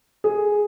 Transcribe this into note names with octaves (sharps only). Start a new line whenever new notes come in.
G#4